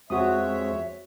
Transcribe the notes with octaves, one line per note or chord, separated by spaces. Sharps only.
F2 G#3 C4 F#4 C#5 E5 D#6